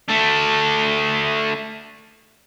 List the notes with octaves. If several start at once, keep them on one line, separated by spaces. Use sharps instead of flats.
A3 D4